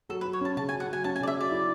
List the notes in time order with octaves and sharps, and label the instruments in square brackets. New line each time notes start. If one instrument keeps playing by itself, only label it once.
[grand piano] F#3 [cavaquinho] A4
[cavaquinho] B4
[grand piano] F#3
[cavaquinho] C#5
[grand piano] C#4 [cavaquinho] A5
[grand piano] C#3 [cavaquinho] A5
[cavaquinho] G#5
[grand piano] F#3
[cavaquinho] F#5
[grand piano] F#3 [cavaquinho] G#5
[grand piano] C#4 [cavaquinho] A5
[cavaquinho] G#5
[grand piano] C#3 [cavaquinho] D5
[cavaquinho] E5
[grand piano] F#3 [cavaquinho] D5
[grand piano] E4